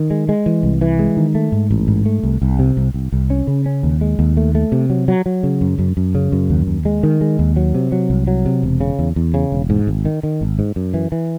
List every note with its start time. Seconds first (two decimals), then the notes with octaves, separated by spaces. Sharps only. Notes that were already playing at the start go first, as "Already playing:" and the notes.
Already playing: D#3
0.10 G#3
0.29 G#3
0.46 E3
0.63 C2
0.81 E3
0.99 G#3
1.17 D#3
1.35 A3
1.52 G#2
1.71 A1
1.88 G#2
2.06 A3
2.23 C2
2.42 C2
2.59 C3
2.77 C2
2.94 C2
3.12 C2
3.30 C#4
3.47 C#3
3.66 C#4
3.83 D#2
4.01 G#3
4.19 D#2
4.37 A3
4.55 A3
4.72 C3
4.90 F#3
5.08 F#3
5.26 F#3
5.43 C#3
5.61 F#2
5.79 F#2
5.97 F#2
6.15 C#3
6.32 F#2
6.50 D#2
6.67 D#2
6.85 G#3
7.03 D#3
7.21 G#3
7.39 D#2
7.56 F#3
7.74 C3
7.92 F#3
8.10 C2
8.27 F#3
8.46 C3
8.63 E1
8.80 C#3
8.99 E2
9.16 E2
9.34 C#3
9.52 E1
9.70 G#2
9.87 G#1
10.05 D#3
10.23 D#3
10.41 G#1
10.59 G#2
10.76 F#2
10.94 E3
11.12 E3